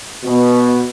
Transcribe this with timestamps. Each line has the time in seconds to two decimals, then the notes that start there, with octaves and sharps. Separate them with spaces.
0.24 B2